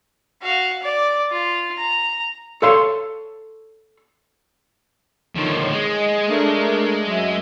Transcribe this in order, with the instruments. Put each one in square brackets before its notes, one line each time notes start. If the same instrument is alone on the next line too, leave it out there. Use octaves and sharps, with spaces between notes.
[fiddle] F#4 F5
D5
F4
A#5
[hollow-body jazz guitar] A4 C#5 F5 C6
[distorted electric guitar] D3 F3 [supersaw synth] D#3 C#5 C6
[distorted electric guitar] G#3 [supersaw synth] D#5
[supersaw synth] A3 D4 A#4
F#2 E5